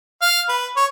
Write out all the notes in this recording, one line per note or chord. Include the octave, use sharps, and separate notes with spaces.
F5
B4
C#5